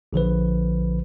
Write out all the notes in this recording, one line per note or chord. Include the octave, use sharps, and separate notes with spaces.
A#1 D3 F3 B4